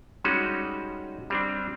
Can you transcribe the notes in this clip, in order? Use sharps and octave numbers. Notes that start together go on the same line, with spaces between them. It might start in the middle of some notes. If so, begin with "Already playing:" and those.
G3 G#3 C#4 D#4 F#4
G3 C4 D4